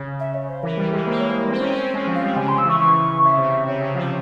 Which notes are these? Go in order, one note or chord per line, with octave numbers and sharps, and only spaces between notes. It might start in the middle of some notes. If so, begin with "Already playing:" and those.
Already playing: C#3
E5
C#5
C5
E3 A#4
G3
G#3
A#3 C5
C#5
C5
C#5
C4 C5
C#4 C#5
C4 C5
G#3
F3
F5
G3
C#3 G#5
C#3 C6
E6
E3 C#6
C#3 C#6
C#3 E5
C3
C3 C#5
C#3
F3
C#5